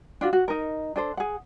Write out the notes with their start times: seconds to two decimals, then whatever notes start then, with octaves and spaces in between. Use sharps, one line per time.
0.21 D4 F4 F#4
0.33 F#4
0.48 D#4 A#4
0.96 D4 A4 C5
1.17 G#4 F#5